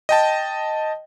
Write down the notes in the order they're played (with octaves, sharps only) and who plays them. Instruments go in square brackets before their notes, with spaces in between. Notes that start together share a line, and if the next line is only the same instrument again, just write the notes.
[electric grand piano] D#5 G5 A5